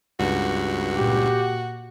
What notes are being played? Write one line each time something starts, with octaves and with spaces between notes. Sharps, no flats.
C#2 G2 F#4
A#2 G4